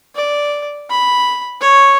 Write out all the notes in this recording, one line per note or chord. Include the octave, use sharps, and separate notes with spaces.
D5
B5
C#5